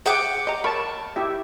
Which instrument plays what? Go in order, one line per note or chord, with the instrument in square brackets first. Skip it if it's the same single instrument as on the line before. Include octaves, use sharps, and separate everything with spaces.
[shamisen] G#4 E5 [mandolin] F#5 G5 D6
[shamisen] D#5 A#5
[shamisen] A#4 C#5 B5 [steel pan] A5 C#6
[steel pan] E4 G4 E5